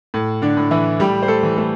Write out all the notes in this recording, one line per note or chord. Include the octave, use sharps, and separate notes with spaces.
A2
D3 D4
A2
E3 E4
A2 G3 G4
C5
A3 A4
E3
A3 A4